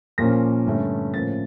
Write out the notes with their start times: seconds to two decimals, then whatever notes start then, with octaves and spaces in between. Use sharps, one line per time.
0.18 A#2 F3 A#3 C#4 A#6
0.66 G2 D3 A3 C#4
1.14 A2 F3 A#3 C#4 A6